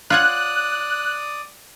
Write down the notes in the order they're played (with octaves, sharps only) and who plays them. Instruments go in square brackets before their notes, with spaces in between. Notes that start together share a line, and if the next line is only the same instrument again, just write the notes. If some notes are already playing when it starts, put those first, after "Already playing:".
[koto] F4 C#5 F#5 [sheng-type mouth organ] D5 D#6 [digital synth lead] F#6